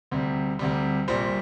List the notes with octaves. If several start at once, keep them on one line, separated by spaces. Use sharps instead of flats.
D2 C3 G3
D2 C3 G3
A#1 A#2 G3 C5